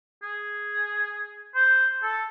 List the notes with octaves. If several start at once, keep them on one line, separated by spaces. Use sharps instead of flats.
G#4
C5
A4